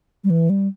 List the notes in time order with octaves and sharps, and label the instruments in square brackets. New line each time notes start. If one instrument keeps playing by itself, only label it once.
[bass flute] G3
E3
G3